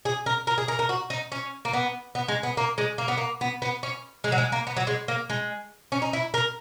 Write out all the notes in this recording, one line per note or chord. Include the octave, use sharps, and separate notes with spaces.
G#4
A#4
A#4
G#4
A#4
A#4
F#4
D#4
C#4
A#3
B3
B3
G#3
B3
A#3
G#3
A#3
B3
A#3
B3
B3
C#4
G#3
F#3
G#3
A#3
B3
F#3
G#3
A#3
G#3
C#4
D#4
E4
A#4